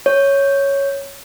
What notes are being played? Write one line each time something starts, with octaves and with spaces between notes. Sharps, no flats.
C#5